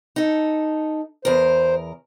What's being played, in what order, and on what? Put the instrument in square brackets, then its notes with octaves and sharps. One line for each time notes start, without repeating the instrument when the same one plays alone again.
[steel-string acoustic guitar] D#4 A4
[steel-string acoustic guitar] E2 A#4 [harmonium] C5